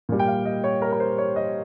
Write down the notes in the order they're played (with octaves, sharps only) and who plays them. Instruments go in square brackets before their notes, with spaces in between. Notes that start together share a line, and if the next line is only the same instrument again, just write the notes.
[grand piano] A#2 G3
G5
F5
D#5
C#5
A#4
A#4
C5
C#5
D#5